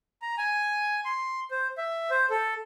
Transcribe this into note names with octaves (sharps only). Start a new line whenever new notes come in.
A#5
G#5
C6
C5
E5
C5
A4